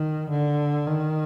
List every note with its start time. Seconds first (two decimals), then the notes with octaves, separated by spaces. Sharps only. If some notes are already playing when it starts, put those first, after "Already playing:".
Already playing: D#3
0.30 D3
0.87 D#3